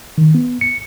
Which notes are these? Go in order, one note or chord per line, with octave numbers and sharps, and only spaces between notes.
D#3
B3
C#7